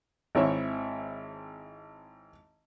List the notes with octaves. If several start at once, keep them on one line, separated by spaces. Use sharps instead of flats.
G#1 C4 E4 C#5 E5